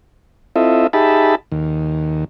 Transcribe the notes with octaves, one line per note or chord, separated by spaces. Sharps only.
C4 E4 F4 A4 D#5 E5
D#4 G4 G#4 E5 A5 B5
D#2